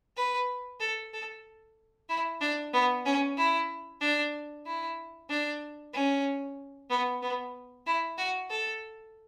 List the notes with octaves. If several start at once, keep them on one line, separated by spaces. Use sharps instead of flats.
B4
A4
A4
E4
D4
B3
C#4
E4
D4
E4
D4
C#4
B3
B3
E4
F#4
A4